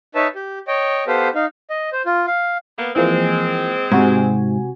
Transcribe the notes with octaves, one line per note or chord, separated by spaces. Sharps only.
D#4 B4 C#5 E5 A5
G4
C#5 D#5 G5
B3 G4 A4 B4 C5 F5
D#4 F5
D#5
C5
F4
F5
A#3 B3
E3 F3 G#3 A#3 C4
G#2 C3 F#4 G#5